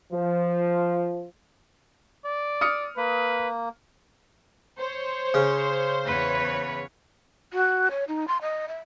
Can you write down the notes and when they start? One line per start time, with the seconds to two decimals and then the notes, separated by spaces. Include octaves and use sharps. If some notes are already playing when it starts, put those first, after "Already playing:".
0.12 F3
2.25 D5
2.61 D#6 F6 C#7
2.97 A#3 B4
4.78 C5 C#5
5.34 C#3
6.04 E2 B4 C#5
7.53 F#4
7.91 C#5
8.08 D#4
8.27 C6
8.41 D#5
8.68 E5